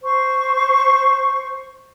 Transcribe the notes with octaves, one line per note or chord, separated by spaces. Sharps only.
C5 C#6